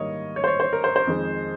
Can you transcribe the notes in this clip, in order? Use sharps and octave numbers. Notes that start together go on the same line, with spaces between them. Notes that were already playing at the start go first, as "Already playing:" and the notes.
Already playing: G#2 D#3 G3 A#3 C#5 D#5
C#5
C5
C#5
C5
A#4
C5
C5
F2 D#3 G#3